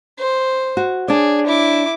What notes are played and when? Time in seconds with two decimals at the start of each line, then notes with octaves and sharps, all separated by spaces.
0.18 C5
0.77 F#4
1.08 D4 G#4 C#5 D5
1.47 E4 D6